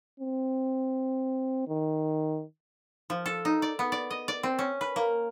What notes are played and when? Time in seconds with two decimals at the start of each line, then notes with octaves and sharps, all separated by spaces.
0.20 C4
1.68 D#3
3.10 F3
3.26 A4
3.45 D#4
3.62 D5
3.79 B3
3.92 D5
4.10 D#5
4.28 D5
4.43 C4
4.59 C#4
4.81 B4
4.96 A#3